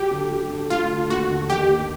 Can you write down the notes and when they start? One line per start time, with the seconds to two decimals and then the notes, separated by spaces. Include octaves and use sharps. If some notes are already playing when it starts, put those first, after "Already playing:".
Already playing: F#3 G4
0.11 D3
0.30 F#3
0.50 D3
0.70 A3 F4
0.90 D3
1.10 D#2 F#4
1.30 D3
1.50 D#3 G4
1.69 D#2